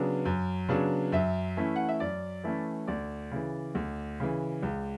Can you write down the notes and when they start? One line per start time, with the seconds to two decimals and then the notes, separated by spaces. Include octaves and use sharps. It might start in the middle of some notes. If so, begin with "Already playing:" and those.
Already playing: C#3 F#3 B3 D4
0.25 F#2
0.69 C#3 F#3 B3 D4
1.12 F#2 E5
1.57 E3 A3 C#4 E4
1.76 F#5
1.89 E5
2.00 F#2 D5
2.44 E3 A3 C#4 E4
2.88 D2 D5
3.32 C#3 E3
3.75 D2
4.20 C#3 E3
4.63 C#2